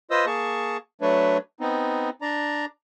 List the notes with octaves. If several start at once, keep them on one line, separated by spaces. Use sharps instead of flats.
F4 B4 C5 D#5 D#6 E6
A#3 G#4 A5 C#6
F#3 A3 D4 B4 C#5
B3 C4 D#4
D4 D5 A#5